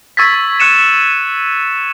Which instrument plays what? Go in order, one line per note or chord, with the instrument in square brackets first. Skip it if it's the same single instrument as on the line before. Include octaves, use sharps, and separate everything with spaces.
[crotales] C#6 E6 G#6 A6 B6
C#6 F#6 B6 C#7 D#7 E7